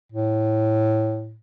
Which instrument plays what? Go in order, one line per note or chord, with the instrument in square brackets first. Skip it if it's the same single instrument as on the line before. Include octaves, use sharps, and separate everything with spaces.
[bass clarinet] A2